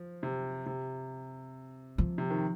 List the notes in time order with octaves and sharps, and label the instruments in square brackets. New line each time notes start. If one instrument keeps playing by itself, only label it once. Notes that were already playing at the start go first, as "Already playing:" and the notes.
Already playing: [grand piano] F3
C3
C3
[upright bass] F3
[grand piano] C3
D#3